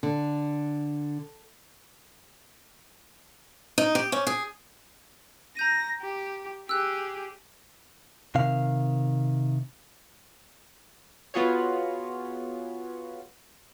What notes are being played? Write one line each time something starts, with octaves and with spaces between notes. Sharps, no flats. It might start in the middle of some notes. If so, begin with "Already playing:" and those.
D3
D#4
G4
C#4
G#4
A#5 G6 A#6 D#7
G4
G4 G#4 E6 F#6
C3 D#3 F5
B3 F4 F#4 G#4 C#5